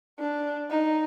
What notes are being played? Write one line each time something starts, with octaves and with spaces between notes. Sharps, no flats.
D4
D#4